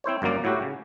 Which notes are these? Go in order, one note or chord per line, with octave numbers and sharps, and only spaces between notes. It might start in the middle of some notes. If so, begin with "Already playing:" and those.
C4 E4 C5 C#5
G1 F#2 F#3 A#3 D5
A2 F#3 E4 F#4 G4
C#3